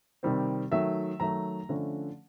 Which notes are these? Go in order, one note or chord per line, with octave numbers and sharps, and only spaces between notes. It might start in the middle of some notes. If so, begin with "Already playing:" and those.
C3 D#3 G3 C4
D#3 F#3 A3 E5
D#3 F#3 A3 A#5
D3 F3 A3 C#4